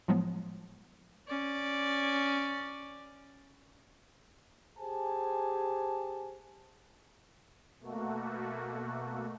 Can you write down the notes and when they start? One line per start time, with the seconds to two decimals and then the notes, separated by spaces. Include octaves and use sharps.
0.08 A2 F3 F#3 G#3 B3
1.28 C#4 D5
4.78 G4 G#4 C5 G#5 A5
7.80 B2 A3 A#3 F#4